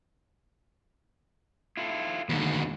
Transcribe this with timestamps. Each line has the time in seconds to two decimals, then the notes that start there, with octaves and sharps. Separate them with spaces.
1.77 E4 F4 A4
2.29 D#2 G#2 B2 D3